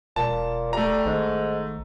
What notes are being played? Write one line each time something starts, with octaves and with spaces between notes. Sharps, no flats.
E1 A#2 A5
G3 A3 A#5
G#1 G#2